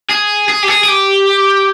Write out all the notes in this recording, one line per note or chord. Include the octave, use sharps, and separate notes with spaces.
G#4
G#4
G4
G#4
G#4
G4